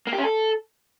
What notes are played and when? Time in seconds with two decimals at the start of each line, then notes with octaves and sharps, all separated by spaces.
0.07 A#3
0.13 G4
0.18 C#4
0.24 A4